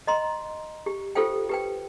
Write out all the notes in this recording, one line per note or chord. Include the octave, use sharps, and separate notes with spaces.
D#5 A#5 C6
G4
F4 G4 A4 C5 F5 G5
G4 B4 G5